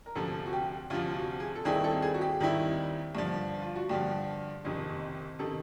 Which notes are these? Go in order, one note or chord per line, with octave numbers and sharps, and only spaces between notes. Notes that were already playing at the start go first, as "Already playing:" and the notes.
A#4
D2 C3 F3 A4
F#4
G4
D2 C3 F3 F4
F#4
G#4
A4
D#2 D#3 G3 C4 E4 G#4
A4
G#4
F#4
G4
D#2 D#3 G3 C4 E4
G2 D3 F3
F4
F#4
G2 D3 F3 G4
F#1 F2 C3 D#3
C3 D#3 A4